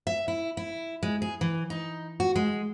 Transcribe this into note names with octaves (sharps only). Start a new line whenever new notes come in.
E5
E4
E4
G#3
G#4
E3
D#4
F#4
G#3